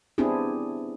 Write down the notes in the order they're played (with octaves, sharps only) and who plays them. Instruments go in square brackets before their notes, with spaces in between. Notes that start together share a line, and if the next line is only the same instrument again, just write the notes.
[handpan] B3 C4 D4 E4 G4 G#4